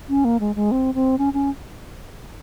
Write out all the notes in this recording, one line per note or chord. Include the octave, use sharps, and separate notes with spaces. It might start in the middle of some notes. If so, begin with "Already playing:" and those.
C#4
A#3
G#3
G#3
C4
C4
C#4
C#4